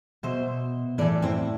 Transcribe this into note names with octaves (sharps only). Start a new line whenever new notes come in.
B2 C5 E5
A2 E3 B4 D5
C4 E4